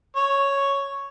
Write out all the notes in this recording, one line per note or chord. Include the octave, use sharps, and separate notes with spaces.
C#5